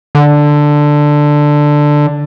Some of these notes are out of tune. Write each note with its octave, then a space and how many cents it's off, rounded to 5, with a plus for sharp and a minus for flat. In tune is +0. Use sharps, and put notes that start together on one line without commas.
D3 +5